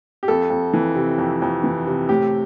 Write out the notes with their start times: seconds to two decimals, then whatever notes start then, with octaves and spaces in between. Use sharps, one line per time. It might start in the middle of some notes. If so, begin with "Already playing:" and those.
0.23 G4
0.28 F2 A4
0.50 F2
0.73 E3
0.96 C3
1.18 F2
1.42 F2
1.64 E3
1.87 C3
2.09 A2 G4